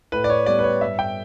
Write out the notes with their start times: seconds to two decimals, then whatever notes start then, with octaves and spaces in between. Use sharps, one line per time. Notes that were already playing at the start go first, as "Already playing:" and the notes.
0.12 A2 B4
0.24 D5
0.30 C#5
0.46 G3 B3 D5
0.59 B4
0.64 C#5
0.81 G2 E5
0.99 G5